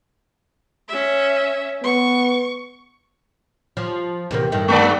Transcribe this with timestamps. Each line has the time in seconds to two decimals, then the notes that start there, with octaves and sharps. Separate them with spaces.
0.88 C#4 E5
1.84 B3 C#6
3.77 F3
4.31 E2 C3 A#3
4.52 G2 D#3 A3
4.68 G#3 A#3 D5